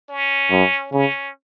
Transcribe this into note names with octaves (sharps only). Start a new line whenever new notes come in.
C#4
F#2
C#3 C#4